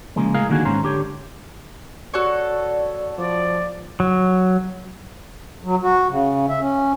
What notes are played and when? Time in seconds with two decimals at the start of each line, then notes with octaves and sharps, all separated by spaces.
0.16 C#3 F3 G#3 A#3
0.34 A2 G#3 G#4 A#4 F5
0.49 D3 D#3 A#3 F#4 G#4
0.65 G#2 C#4 C5 A#5
0.83 D3 G4 C#5
2.14 F#4 A4 C#5 D5
3.18 F3 D5
4.00 F#3
5.64 F#3
5.83 F#4
6.10 C#3
6.49 E5
6.61 C#4